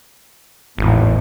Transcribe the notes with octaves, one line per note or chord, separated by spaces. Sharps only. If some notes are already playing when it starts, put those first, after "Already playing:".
G#1 E2 A2